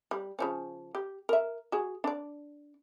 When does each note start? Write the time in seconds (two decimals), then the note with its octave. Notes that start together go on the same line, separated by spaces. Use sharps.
0.11 G3
0.39 C#3 F3 C#4
0.95 G4
1.29 A#4 E5
1.72 F#4 G#4
2.04 D4 D5